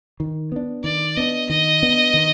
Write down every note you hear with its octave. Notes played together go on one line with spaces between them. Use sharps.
D#3
B3 D4
D#3 D5
B3 D4 D#5
D#3 D#5
B3 D4
D#3